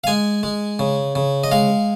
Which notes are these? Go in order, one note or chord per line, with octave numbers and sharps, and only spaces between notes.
F5
G#3 G#5
G#3
C#3
C#3
D#5
G#3 F5